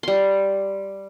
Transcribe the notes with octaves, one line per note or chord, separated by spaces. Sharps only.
G3 C6